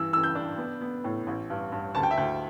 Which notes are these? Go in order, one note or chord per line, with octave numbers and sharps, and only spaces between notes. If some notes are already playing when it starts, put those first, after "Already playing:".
Already playing: G2 E3 E6
E3 E6
G6
D4
B3
B3
A2
A1
G2
G2
D2 A5
G5
E5
D2 G5